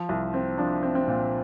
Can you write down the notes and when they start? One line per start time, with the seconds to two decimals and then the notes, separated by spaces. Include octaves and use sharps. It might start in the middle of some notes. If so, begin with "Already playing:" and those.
Already playing: F3
0.09 C2
0.34 C4
0.58 F3 D4
0.83 C4
0.95 C4
1.08 A#2